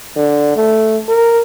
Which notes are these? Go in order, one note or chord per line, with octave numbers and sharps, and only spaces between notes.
D3
A3
A#4